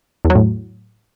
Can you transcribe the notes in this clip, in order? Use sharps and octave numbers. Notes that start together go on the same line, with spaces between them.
E2
F#3
A2